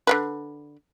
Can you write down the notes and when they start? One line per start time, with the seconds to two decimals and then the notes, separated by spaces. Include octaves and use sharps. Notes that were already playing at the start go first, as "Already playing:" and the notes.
0.07 D3 A3 B4